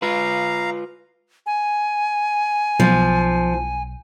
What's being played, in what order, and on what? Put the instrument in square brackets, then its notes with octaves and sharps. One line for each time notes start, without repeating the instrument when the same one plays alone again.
[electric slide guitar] F4 B4 [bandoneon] F5 A#5
[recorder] G#5
[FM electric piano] B1 [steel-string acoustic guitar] F3